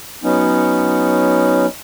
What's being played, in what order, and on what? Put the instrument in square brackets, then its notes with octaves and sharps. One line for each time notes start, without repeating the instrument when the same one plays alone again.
[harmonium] F#3 B3 C#4 D#4